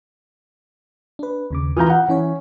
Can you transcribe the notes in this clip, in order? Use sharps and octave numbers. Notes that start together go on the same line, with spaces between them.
D4 B4
D#2 C#3 D6
E3 F4 A#5 D#6 F6 G6
F#5
E3 C#4 E4 C#5